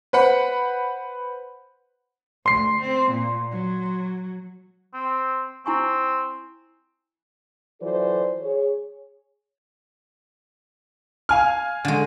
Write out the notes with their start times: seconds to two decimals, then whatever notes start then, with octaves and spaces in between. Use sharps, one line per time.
0.13 B4 C5 F#5 B5
2.46 D2 C6 C7
2.80 C4
3.10 A#2
3.51 F#3
4.93 C4
5.66 C4 E4 G#5 C#6
7.81 E3 F#3 F4 A4 C5 D5
8.42 G#4 C#5
11.29 F5 G#5 F6
11.85 D3 G#3